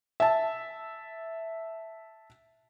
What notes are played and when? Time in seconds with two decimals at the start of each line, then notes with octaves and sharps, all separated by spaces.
0.20 E5 A5